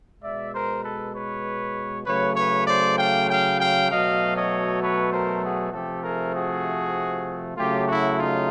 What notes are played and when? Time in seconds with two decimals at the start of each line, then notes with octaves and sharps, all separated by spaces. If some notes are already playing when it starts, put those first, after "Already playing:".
0.22 B2 G#3 D5 E5
0.53 A#4 C5
0.83 A4 B4
1.13 B4 C#5
2.05 C#3 F#3 A3 B4 C#5
2.36 B4 C#5
2.66 C5 D5
2.97 F5 G5
3.28 F5 G5
3.58 F5 G5
3.89 B2 F#3 A3 D#5 F5
4.35 C#5 D#5
4.81 B4 C#5
5.11 A#4 C5
5.42 F#4 G#4
5.72 C3 F3 A3 G4 A4
6.03 G#4 A#4
6.34 F#4 G#4
7.57 C#3 F#3 A3 F4 G4
7.87 E4 F#4
8.18 D#4 F4